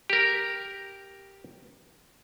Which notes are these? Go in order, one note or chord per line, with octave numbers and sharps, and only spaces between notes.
G4 A#4